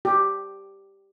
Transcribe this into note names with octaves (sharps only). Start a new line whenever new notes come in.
G4